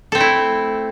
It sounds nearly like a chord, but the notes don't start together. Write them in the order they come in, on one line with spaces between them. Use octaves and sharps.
A4 C4 A3 E4